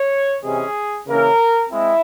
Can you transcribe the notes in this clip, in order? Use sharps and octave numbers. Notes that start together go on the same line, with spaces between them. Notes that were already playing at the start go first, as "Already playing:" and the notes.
Already playing: C#5
C3 E3 G#3 C#4 G#4
C#3 E3 A#3 C#4 A#4
G#3 C4 E4